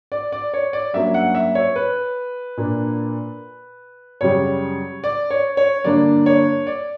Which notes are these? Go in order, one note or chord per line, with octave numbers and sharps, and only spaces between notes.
D5
D5
C#5
D5
G2 F#3 A#3 C#4 E5
F#5
E5
C#5
B4
A#2 A#3 D4
F#2 C#3 G3 C#5
D5
C#5
C#5
G2 D3 A#3 D4 D5
C#5
D5